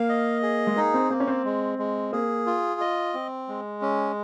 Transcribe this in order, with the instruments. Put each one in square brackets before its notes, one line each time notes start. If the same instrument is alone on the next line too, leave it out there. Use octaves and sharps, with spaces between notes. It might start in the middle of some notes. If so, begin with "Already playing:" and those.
Already playing: [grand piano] A#3 [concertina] F5
[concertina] D#5
G#4
[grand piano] G#3
[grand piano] A#3 [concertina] D#4
[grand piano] C4
[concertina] A#3 [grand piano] C4
[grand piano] C#4
C4
[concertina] G#3
G#3
[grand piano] A#3 [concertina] G#4
[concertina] F4
D#5
C4
G#3
C#4